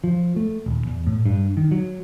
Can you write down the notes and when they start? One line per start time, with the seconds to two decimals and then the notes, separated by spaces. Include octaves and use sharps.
0.04 F3
0.36 A3
0.66 D#1
0.85 E2
1.07 A2
1.26 G2
1.57 D#3
1.71 F#3